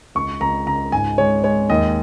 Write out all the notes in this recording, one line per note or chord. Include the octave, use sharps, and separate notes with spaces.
C#2 C#6
C#2 A#5
C#3 A#5
G#2 G#5
G#3 C#5
G#3 C#5
D#2 D#5